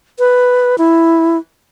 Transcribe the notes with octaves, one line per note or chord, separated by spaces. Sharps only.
B4
E4